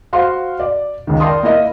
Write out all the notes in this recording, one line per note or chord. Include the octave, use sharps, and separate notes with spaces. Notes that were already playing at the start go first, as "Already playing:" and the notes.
F#4 C5 F5 C6
D5
C#2 D#3
A#4 D5 G5 A5 C6 D#6
A#3 E4 A#4 D#5